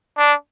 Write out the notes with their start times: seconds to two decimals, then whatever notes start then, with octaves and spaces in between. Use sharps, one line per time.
0.17 D4